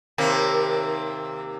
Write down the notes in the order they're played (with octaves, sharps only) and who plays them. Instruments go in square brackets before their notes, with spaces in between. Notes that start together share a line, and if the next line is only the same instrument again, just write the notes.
[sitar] D#2 C3 A#3